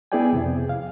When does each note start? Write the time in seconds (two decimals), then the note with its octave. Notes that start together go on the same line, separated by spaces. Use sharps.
0.12 B3 E4 G#4 D5 G5 G#5
0.33 F2 C3
0.69 F5